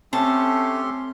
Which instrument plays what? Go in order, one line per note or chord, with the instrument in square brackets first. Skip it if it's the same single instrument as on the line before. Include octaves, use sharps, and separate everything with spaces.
[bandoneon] A3 C#4 [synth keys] C4 [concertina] G4 A4 C6 [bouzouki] A5